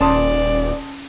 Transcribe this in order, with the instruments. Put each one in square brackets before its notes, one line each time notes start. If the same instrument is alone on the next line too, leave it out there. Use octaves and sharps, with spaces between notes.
[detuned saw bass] D#1 [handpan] C#4 [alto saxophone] D5 [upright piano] A5 C6 D#6